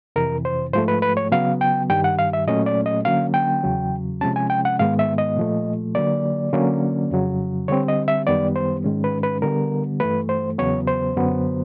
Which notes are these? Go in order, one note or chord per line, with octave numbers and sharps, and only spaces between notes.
F2 C3 E3 A#4
C5
G#2 F3 A3 C5
B4
B4
C#5
C#3 F#3 B3 F5
G5
G2 D#3 G3 G5
F#5
F5
E5
A#2 F#3 A3 C#4 D#5
D5
D#5
D3 F#3 A#3 C#4 F5
G5
E2 C#3 F#3
C3 F3 G#3 C#4 A5
G#5
G5
F#5
G#2 D#3 G#3 B3 F5
E5
D#5
A#2 F3 A3
D3 F#3 A#3 D5
D3 F#3 A#3 C#4
F2 C#3 F#3
D3 G3 C4 C#5
D#5
E5
F#2 D#3 G3 B3 D5
C5
G#2 D#3 G#3 C#4
B4
B4
D3 G3 B3 A#4
G2 E3 A3 B4
C5
E2 C#3 F#3 B3 C#5
C5
F#2 D3 F#3 B3